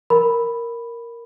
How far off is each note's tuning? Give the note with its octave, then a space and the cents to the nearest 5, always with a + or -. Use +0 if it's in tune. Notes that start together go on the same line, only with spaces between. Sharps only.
A#4 +0 B5 +0